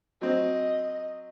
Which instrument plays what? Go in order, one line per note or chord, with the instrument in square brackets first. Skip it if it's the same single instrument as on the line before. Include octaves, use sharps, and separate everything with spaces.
[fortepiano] F#3 C4 [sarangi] D#5